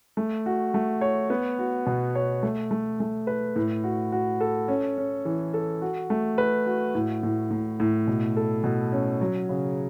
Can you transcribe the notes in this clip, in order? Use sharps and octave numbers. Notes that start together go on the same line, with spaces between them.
A3
F#4
A3
C#5
B3
F#4
B2
C#5
A3
A3
A3
B4
A2
F#4
F#4
A4
C#4
C#4
E3
A4
F#4
A3
B4
F#4
A2
A2
A2
A2
B2
A4
B2
C#4
F#3
C#3